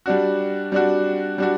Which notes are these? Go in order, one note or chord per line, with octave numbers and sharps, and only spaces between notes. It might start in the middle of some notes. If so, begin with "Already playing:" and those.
G3 D4 F#4
G3 D4 F#4
G3 D4 F#4